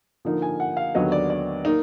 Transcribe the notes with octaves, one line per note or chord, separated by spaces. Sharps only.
D3 F3 A#3 D#4
G#5
F#5
F5
D#2 D3 F#3 B3 D#5
D5
D5
A#3 D#4